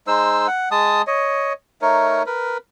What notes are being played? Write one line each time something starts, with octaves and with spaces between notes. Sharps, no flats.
G#3 D#4 C5 E6
F#5
G#3 A5 D#6
C#5 D#5
A3 D#4 A#4 C#5
A#4 B4